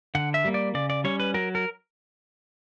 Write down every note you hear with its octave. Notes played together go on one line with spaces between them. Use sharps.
D3 F#5
E5
G3 A#3
D5
C#3 D5
D5
G3 C#4 C#5
B4
F#3 A#4
A#4